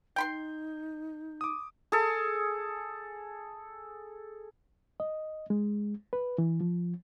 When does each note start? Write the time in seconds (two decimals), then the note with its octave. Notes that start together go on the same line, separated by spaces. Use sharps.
0.16 D#4 G5 B5 C6 G6
1.41 D6 D#6
1.92 G#4 A4
5.00 D#5
5.50 G#3
6.13 B4
6.38 E3
6.61 F3